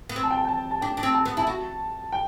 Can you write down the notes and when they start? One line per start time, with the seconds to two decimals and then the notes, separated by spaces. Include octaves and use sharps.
0.09 B3
0.16 C4
0.23 A5
0.31 G5
0.37 A5
0.45 G5
0.48 A5
0.71 A5
0.81 D4 G5
0.97 D4
1.03 C4
1.15 A5
1.26 B3
1.37 E4 A5
1.47 F#4
2.12 G5